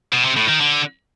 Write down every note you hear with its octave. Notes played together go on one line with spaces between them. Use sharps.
B2
C3
A2
D#3
D3